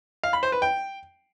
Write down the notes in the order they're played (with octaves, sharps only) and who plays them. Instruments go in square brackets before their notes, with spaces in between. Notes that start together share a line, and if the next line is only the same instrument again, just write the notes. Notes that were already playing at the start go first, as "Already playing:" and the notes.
[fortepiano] F5
B5
C5
B4
G5